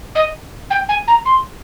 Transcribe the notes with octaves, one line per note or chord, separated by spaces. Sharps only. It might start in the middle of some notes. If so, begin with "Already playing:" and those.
D#5
G5
G#5
A#5
C6